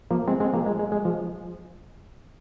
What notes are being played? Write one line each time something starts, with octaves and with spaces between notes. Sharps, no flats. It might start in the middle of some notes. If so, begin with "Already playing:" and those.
F3 A#3
G#3 C4
G#3 C4
F3 A#3
G#3
G#3
G#3
F3